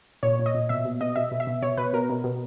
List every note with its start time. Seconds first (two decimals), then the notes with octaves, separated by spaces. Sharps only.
0.23 A#2 C#5
0.39 A#2
0.46 D#5
0.55 A#2
0.69 B2 E5
0.85 B2
1.01 B2 D#5
1.16 B2 E5
1.31 B2
1.40 E5
1.47 B2
1.62 B2 C#5
1.77 B2 B4
1.93 B2 A#4
2.10 B2
2.24 B2